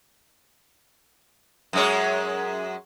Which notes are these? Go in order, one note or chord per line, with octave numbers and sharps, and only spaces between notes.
F#2 G#3 C#5